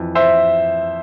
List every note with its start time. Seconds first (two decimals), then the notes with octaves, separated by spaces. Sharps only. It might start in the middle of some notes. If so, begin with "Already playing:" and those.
Already playing: F2 E3
0.15 C5 E5